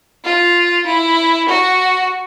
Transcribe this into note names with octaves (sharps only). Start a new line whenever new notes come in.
F4
E4
F#4